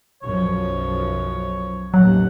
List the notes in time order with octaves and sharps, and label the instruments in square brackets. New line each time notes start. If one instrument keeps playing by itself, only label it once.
[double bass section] B1 F#2 F3 [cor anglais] C#5
[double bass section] A1 D#2 [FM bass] F#3 [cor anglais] F#5